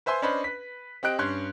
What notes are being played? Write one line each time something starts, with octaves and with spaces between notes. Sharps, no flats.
B4 C5 E5 G#5 C6
C#4 D4 B4 C5 D#5 B5
B4 B6
C4 G4 D#5 F#6 D7
G2 C#4 C6 F#6